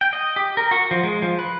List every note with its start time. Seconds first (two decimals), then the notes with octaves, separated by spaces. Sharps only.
0.01 G5
0.13 D#5
0.36 G4
0.57 A#4
0.71 F#4
0.91 F3
1.04 G#3
1.22 F3
1.39 B4